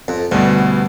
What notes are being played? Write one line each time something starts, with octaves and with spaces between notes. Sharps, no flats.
F2
D2 G2 B2